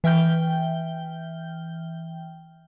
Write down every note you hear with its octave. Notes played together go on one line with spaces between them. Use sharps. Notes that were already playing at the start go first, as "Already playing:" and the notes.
E3 E5 G5 F6 G6 G7